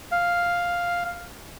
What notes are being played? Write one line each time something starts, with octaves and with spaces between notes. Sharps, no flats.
F5